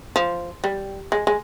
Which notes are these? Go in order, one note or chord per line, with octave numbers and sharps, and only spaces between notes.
F3
G3
G#3
G#3